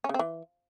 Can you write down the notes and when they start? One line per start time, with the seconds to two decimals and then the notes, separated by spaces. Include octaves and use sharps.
0.04 C#4
0.09 C#3
0.14 C4
0.19 E3